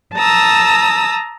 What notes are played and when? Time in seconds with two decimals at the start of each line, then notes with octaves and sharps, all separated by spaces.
0.14 A5 A#5 D#6 E6